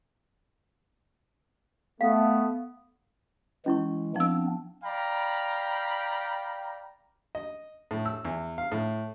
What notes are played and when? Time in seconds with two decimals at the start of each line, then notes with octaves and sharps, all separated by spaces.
2.01 A3 B3 F5
3.66 E3 G#3 C#4 E4 C#6
4.16 F3 B3 C4 D4 E6
4.84 D5 F5 G5 A#5 B5
7.35 D#5
7.91 A2
8.06 E6
8.25 E2
8.58 F5
8.72 A2